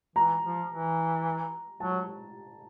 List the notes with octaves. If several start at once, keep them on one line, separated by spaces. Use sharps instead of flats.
E3 A#5
F3
E3
F#3 A5